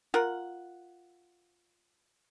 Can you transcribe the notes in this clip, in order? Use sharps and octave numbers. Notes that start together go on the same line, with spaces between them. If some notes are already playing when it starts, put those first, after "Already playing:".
F4 A#4 F#5